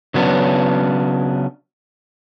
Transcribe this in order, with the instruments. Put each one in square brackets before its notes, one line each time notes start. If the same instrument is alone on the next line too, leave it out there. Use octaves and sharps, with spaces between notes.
[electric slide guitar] C#3 F#3 B3 C#4 D4